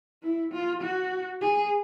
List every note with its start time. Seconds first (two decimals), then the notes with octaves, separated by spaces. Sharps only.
0.23 E4
0.52 F4
0.81 F#4
1.41 G#4